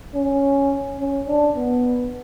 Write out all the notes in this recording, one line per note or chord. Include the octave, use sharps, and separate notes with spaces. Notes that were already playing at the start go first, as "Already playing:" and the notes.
C#4
C#4
D4
B3